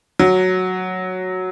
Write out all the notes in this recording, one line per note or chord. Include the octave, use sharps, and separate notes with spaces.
F#3